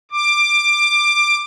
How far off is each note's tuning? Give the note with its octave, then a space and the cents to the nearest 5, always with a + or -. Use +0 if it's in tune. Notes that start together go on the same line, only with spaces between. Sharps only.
D6 +15